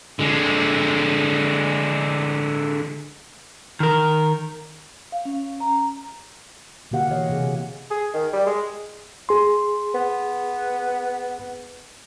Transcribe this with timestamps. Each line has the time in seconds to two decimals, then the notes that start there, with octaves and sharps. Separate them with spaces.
0.19 D3 G#3
3.80 D#3 A#4
5.12 F5
5.25 C#4
5.60 A#5
6.91 B2 D3 A#3 G4 F5 F#5
7.10 E3 G4 C#5 D#5
7.30 C3 G#4
7.90 G#4
8.13 D#3
8.33 G3
8.46 G#3
9.29 G#4 C6
9.94 B3